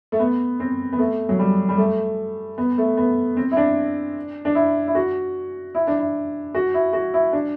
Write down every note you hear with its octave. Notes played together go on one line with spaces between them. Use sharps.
A3
B3
C4
B3
A3
F#3
G3
G3
A3
B3
A3
B3
C4
E4
D4
D4
E4
E4
F#4
E4
D4
E4
F#4
E4
F#4
E4
D4